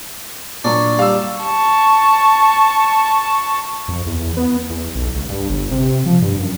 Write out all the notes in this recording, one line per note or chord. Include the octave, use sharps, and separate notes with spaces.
A#2 F#3 D4
G3 F5 E6
A5 C#6
F2
E2
B3
E2
B1
C#2
G2
G1
C3
F3
G2
F#2